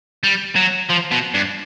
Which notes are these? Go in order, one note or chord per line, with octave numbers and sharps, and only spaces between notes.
G3
F#3
F3
B2
G2